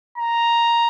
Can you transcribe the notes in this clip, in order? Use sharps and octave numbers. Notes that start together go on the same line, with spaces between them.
A#5